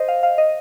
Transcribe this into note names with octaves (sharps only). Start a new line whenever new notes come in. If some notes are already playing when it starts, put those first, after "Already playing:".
Already playing: C5 D#5
F5
F5
D#5